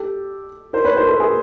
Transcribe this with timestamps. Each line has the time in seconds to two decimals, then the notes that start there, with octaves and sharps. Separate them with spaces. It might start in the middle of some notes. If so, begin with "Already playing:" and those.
Already playing: G4 A4
0.73 A#4 C5
0.84 B4 C#5
0.96 A#4 C5
1.08 A4 B4
1.19 G#4 A#4